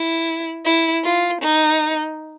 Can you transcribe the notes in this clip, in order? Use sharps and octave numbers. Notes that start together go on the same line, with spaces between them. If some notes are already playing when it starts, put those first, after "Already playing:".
Already playing: E4
E4
F4
D#4